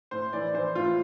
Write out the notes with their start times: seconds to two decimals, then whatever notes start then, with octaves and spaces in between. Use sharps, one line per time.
0.11 A2 C5
0.33 E3 D5
0.54 E3 C5
0.75 A2 F4